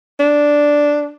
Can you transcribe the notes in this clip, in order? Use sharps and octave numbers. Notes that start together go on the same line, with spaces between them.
D4